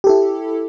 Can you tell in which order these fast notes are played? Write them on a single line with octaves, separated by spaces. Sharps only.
G4 A4 E4